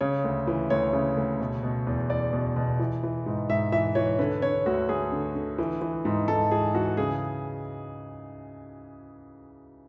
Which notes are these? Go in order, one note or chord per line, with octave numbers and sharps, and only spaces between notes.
C#3 C#5
D2
E3
D2 C#5
C#3
D2
B2
B2
E2
E2 D5
B2
B2
E3
E3
G#2
G#2 E5
E3 E5
E3 C#5
D3 B4
D3 C#5
D2 F#4
D2 G#4
D3
D3
E3
E3
G#2
G#2 A4
E3 G#4
E3 F#4
C#3 G#4